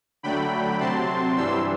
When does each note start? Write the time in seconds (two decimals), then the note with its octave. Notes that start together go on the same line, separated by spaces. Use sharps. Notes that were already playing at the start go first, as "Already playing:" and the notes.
0.23 D3 F#3 A3 G5 B5
0.80 C3 F#3 C4 A5 C6
1.36 G2 E3 G3 C6 E6